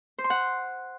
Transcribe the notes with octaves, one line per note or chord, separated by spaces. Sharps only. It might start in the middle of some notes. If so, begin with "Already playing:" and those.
C5
C6
F#5